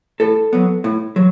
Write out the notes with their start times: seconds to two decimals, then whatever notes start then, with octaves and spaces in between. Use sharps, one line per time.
0.20 A2 A4
0.53 F#3 B3
0.84 A2
1.16 F#3